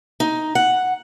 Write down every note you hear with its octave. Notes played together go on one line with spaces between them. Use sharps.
D#4
F#5